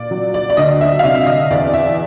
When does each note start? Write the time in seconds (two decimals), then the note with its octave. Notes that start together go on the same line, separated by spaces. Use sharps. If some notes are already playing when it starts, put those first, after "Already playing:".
Already playing: A#2 D5
0.11 F#3
0.34 D5
0.50 D5
0.57 D2 D#5
0.81 E5
0.99 F5
1.03 C3 E5
1.27 D#5
1.50 E2 D5
1.74 E5